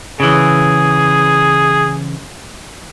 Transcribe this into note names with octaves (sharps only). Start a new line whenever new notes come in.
C#3 E3 G#4